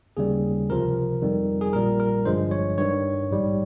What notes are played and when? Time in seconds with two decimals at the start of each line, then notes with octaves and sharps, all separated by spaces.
0.17 D#2 C#3 G3 G#4
0.69 C#2 C3 F3 A#4
1.22 F2 D#3 G3
1.61 G#4
1.73 A#1 A#2 G3 A#4
2.00 A#4
2.25 G1 G2 F3 G#3 C5
2.51 C#5
2.78 G2 D#3 G3 C#5
3.30 A#1 G#2 G3